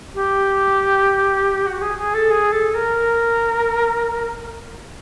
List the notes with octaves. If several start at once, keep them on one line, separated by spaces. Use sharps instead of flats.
G4
F#4
G#4
G#4
A4
G#4
A4
A#4